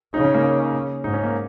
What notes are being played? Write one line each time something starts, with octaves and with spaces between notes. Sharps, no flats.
C#3 D#4
C#4
A#3
C#4
G#2 D#4
C#4
A#3